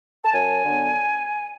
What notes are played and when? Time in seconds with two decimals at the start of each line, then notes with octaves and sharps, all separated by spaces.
0.25 A5
0.33 F#2 G#5
0.62 D3 F#3 B3 D4